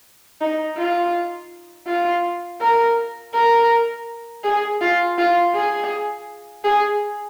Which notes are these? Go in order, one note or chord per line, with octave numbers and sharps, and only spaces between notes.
D#4
F4
F4
A#4
A#4
G#4
F4
F4
G#4
G#4